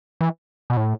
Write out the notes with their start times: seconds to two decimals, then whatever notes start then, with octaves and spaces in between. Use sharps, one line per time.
0.21 E3
0.70 B2
0.77 A2